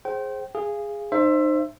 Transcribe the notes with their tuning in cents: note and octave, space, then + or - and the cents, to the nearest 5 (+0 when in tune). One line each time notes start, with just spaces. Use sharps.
G#4 +10 C5 +20 G5 -30
G#4 -10 F5 -20
D#4 -30 C5 +10 E5 +20